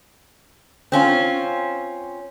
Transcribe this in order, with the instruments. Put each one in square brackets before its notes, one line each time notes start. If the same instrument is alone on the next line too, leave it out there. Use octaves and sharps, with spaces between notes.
[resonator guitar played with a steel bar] C4 C#4 F4